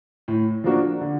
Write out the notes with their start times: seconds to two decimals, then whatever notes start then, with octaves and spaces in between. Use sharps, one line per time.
0.28 A2
0.64 F3 A#3 D4 F#4
1.01 D3